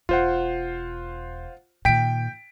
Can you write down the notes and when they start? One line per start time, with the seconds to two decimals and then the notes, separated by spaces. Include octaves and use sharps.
0.09 E1 F4 C5 F#5
1.85 A#2 D#3 G5 B6 D7